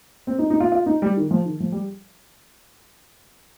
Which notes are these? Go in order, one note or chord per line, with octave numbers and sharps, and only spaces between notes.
C4
D#4
D#4
F4
F4
D#4
G3
D#3
F3
D#3
F3
G3